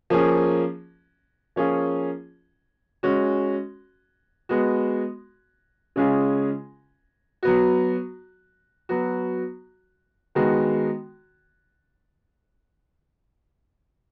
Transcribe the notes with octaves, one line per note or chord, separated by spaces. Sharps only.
F3 A#3 C#4 G#4
F3 A#3 C#4 F4 G#4
G#3 C#4 F#4
G#3 B3 F#4
C#3 G#3 C#4 F4 G#4
F#3 B3 F#4
F#3 B3 F#4
D#3 G#3 B3 F#4